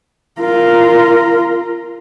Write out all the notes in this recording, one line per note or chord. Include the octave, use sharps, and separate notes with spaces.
F4 A#4